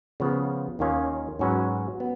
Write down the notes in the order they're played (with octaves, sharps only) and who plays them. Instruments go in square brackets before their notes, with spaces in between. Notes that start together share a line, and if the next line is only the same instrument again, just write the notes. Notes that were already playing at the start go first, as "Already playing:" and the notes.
[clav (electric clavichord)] C#3 F3 B3
D#2 D#3 A#3 C#4 F4
G#2 F#3 C#4 F#4 B4
B3